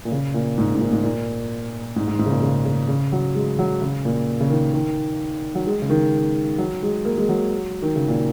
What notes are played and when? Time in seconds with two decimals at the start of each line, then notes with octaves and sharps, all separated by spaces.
0.05 A#2
0.12 C#3
0.34 A#2
0.58 G#2
0.75 G#2
0.81 A#2
0.91 G#2
1.03 A#2
1.96 G#2
2.08 G#2
2.19 G#2
2.26 C#3
2.31 A#2
2.42 C#3
2.65 C#3
2.88 C#3
3.12 F#3
3.35 G#3
3.59 F#3
3.81 C#3
4.05 A#2
4.41 C#3
4.50 D#3
4.74 D#3
5.55 F#3
5.66 G#3
5.82 C#3
5.90 D#3
6.58 F#3
6.83 G#3
7.05 A#3
7.17 G#3
7.29 F#3
7.82 D#3
7.96 C#3
8.08 A#2